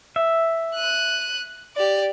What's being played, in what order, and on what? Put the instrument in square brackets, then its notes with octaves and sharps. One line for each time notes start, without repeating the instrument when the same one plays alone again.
[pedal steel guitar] E5
[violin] F#6 D#7
G4 D5